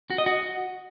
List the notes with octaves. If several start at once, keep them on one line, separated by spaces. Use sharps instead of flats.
F#4
D#5
F#4